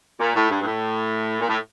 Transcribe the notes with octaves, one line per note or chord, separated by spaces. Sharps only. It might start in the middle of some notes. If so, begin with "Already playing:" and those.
A#2
A2
G2
G2
A2
A#2
A2